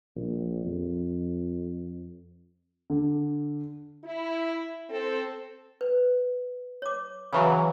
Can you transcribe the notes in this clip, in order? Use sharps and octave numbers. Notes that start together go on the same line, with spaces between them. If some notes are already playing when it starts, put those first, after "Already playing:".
A#1
F2
D3
E4
C4 A4
B4
C#5 D6
C#3 E3 F#3 G#5